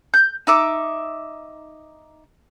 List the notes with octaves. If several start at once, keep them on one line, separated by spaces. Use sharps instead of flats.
G6
D#4 E5 D6